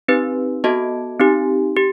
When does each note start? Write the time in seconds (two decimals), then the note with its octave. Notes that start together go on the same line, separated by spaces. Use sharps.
0.08 C4 D#4 G4 B4
0.64 B3 F#4 A4 D#5 A5
1.20 C4 D#4 G4
1.76 G4